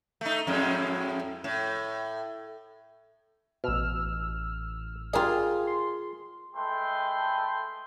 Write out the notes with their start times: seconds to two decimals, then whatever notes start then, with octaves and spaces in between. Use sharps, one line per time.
0.21 A3 D#4
0.47 F2 A2 G#3
1.44 A2
3.64 A1 B2 E6 F6
5.13 F4 G4 G#4 A#4 D5
5.67 C6
6.56 G#3 A3 A4 B4 G5 C6